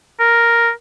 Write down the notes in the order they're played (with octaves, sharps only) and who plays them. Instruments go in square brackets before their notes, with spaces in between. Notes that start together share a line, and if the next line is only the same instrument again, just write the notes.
[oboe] A#4